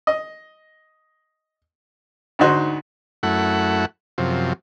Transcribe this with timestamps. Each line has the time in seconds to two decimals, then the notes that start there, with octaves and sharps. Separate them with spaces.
0.07 D#5
2.39 D2 G#2 D#4 F#4 C5
3.23 F#2 A3 E4 F#5
4.18 F#2 C3 F3